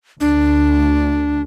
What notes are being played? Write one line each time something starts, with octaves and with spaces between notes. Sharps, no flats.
D2 D4